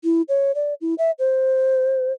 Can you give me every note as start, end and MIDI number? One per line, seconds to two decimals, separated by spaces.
0.04 0.22 64
0.29 0.52 73
0.55 0.74 74
0.81 0.94 64
0.98 1.11 76
1.19 2.12 72